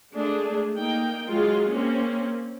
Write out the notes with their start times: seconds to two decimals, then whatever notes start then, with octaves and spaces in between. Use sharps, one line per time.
0.14 G#3 A3 D4 G#4
0.77 A#3 D#4 G5
1.30 F#3 G#3 F4 G#4
1.74 A#3 C4 C#4